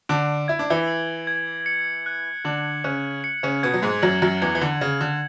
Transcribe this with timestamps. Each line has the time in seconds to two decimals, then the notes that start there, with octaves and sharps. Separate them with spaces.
0.09 D3 D4 D7
0.48 E4 G#6
0.59 D4
0.70 E3 E4
0.88 F#7
1.27 G#6
1.66 C#7
2.06 F#6
2.45 D3 D4 F#7
2.84 C#3 C#4 F#6
3.24 C#7
3.43 C#3 C#4
3.63 B2 B3 G#6
3.74 F#3
3.83 G#2 G#3
4.02 F#2 F#3 F#7
4.22 F#2 F#3
4.42 E2 E3 G#6
4.55 E3
4.61 D3
4.81 C#3 G#6
5.01 D3